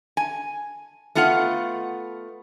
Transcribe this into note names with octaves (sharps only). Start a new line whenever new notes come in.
G#5
A3 B3 F4 F5 F#5